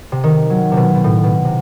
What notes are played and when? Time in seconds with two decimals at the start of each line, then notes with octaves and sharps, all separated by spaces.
0.12 C3
0.24 D#3
0.50 F#3
0.72 C3
0.77 B2
0.95 B2
1.04 A2
1.24 B2
1.45 C3